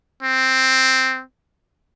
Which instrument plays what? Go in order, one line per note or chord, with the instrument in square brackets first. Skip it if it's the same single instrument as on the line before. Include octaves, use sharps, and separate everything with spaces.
[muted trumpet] C4